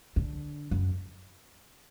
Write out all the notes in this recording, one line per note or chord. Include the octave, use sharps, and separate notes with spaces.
D3
F#2